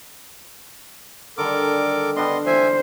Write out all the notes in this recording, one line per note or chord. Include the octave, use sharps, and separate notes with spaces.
D3 D#3 G3 A4 A#4 D6
G3 B3 D4 D#5 C6
C5 E5 G#5